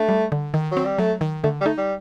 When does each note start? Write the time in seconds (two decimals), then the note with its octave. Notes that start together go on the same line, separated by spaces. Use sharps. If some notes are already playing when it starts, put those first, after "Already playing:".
Already playing: A3 D4
0.09 G3
0.32 D3
0.54 D#3
0.72 F#3
0.77 C4
0.85 G3
0.98 F#3 A3
1.21 D#3
1.44 D3 A3
1.61 G3
1.66 A3 D#4
1.77 G3